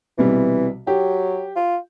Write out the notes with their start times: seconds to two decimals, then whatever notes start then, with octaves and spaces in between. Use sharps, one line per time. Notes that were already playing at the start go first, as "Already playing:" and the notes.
0.18 B1 C3 E3 G3
0.87 F#3 G4
1.56 F4